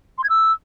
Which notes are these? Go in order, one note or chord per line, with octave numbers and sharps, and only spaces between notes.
C6
G#6
E6